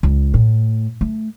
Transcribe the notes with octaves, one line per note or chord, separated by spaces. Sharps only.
C#2
A2
A3